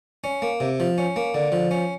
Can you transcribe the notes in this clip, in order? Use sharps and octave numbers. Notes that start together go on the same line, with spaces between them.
C#4
A#3
C3
F3
C#4
A#3
D3
F3
C#4